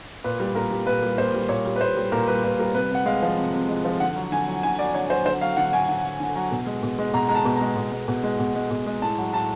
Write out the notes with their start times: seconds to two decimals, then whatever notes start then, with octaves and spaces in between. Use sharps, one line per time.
0.24 A#2 B4
0.40 G3
0.55 A#2 A#4
0.71 G3
0.87 A#2 B4
1.03 G3
1.18 A#2 C5
1.34 G3
1.49 A#2 C#5
1.66 G3
1.76 B4
1.81 A#2 C5
1.97 G3
2.12 A#2 A#4
2.28 G3 B4
2.44 A#2 B4
2.59 G3 A#4
2.74 C3 B4
2.90 C3 F#5
3.06 G#3 F5
3.22 F3
3.38 C3
3.54 C3
3.69 G#3
3.85 F3
4.00 D3 F#5
4.16 F#3
4.32 D3 G#5
4.48 F#3
4.63 D3 G#5
4.79 F#3 D5
4.94 D3 C#5
5.10 F#3 C5
5.25 D3 C5
5.41 F#3 F5
5.57 D3 F#5
5.73 F#3 G#5
5.88 D3
6.04 F#3
6.20 D3
6.36 F#3
6.51 B2
6.66 G#3
6.83 B2
6.99 G#3
7.14 B2 A#5
7.29 G#3 A#5
7.35 A5
7.45 B2
7.56 A#5
7.61 G#3
7.77 B2
7.92 G#3
8.08 B2
8.23 G#3
8.39 B2
8.55 G#3
8.71 B2
8.86 G#3
9.02 A2 A5
9.18 F#3
9.34 A2 A5